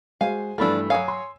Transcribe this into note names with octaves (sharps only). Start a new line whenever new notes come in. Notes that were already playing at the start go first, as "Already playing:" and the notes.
G#3 F#4 C5 F5 G#5
G2 E3 F3 A3 D4 A4 B5 E6
F#3 C#5 F5 G#5 D#6
C6